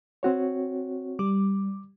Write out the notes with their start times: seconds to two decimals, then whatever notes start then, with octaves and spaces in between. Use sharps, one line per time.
0.23 C4 F#4 C#5
1.19 G3 D6